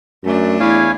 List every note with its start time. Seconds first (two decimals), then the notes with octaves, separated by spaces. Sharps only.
0.24 F#2 A3 D4
0.60 E2 E4 C#5 F5 G#5